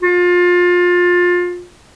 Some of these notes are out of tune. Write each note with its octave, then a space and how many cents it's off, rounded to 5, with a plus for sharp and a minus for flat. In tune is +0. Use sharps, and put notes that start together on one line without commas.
F4 +25